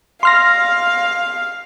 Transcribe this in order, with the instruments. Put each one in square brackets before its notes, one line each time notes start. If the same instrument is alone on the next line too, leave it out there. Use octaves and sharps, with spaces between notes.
[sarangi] F5 [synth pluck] C6 F6 A#6